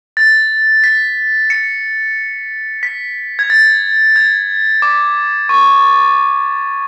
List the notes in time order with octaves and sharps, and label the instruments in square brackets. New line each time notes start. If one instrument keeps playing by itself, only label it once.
[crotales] A6
B6
C#7
B6
G#6
A6
G#6
D6
C#6